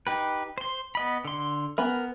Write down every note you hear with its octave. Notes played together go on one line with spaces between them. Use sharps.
D#4 G4 B4
C5 C6
B3 D#5 B5
D3 C6
B3 A#4 G#5 B5